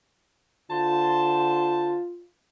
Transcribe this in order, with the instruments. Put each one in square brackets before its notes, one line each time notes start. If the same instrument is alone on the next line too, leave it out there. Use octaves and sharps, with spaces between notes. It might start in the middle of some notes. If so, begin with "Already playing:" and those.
[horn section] D3 C5 A5 [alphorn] F4